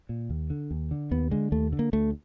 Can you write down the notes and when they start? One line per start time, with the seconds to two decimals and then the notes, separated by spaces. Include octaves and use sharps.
0.09 A#2
0.30 D#2
0.50 D3
0.71 D#2
0.91 D3
1.11 D#2 B3
1.31 D3 G#3
1.52 D#2 A3
1.73 D3
1.79 A#3
1.93 D2 A3